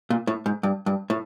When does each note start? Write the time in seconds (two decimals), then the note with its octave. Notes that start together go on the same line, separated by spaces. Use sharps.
0.10 A#2
0.27 A2
0.46 G#2
0.63 G2
0.86 G2
1.10 A2